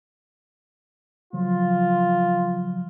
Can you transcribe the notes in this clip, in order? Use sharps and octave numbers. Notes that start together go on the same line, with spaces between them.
C#3 F3 F#3 F4